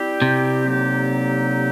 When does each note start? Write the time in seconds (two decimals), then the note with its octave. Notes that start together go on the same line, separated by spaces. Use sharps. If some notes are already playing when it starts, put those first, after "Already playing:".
Already playing: G3 C4 E4 G4
0.22 C3
0.66 D3 F#3 A#3 D#4 G4